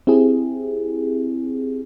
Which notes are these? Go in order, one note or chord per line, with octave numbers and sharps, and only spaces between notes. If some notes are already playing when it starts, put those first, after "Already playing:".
C4 E4 G4 G#4